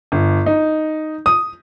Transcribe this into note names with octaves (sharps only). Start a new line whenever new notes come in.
G1
D#4
D#6